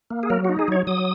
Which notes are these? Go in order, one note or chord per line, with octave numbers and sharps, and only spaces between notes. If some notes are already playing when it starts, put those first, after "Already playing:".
A#3
G#4
F#3 A#4
D#4 F#4
G#4
F#3 C#5
F#3 D#6